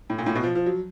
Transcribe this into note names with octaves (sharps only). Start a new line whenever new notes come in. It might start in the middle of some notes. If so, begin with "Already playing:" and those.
A2
A#2
A2
B2
F3
F3
F#3